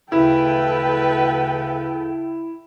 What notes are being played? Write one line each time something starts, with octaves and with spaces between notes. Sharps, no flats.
D2 C#3 E4 A4 B4 G5